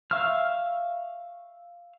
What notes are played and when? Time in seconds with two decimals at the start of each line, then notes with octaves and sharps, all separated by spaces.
0.11 E5 F5 C#6 E6 F6